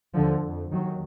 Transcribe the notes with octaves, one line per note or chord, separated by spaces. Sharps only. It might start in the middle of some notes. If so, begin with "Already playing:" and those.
D#2 D3 F3
F2
D#2 D#3 F#3